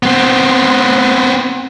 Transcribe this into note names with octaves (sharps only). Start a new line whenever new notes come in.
B3 C4